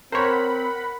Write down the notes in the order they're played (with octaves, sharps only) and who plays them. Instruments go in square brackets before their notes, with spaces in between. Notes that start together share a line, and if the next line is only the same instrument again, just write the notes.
[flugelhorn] C4 [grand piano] A#4 [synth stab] C5 C#5 [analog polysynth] F#5 B5